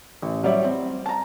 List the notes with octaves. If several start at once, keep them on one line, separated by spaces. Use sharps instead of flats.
A1
F#3 G3 C#5 D5 E5
C4
A5 A#5